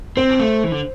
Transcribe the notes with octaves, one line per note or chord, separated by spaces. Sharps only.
C4 C5
A3
E3
D3